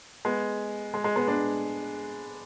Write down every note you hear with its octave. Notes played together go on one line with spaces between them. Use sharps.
G#3 B3
G#3
G#3
G#3 B3
B3 D4